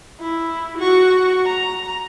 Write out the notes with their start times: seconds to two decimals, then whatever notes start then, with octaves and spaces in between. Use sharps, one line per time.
0.20 E4
0.78 F#4 C#6
1.46 A#5